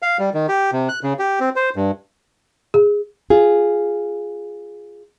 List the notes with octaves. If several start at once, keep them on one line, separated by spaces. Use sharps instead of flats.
F5
G3
D#3
G4
C3
F#6
C#3
G4
C4
C5
G2
G#4
F4 G#4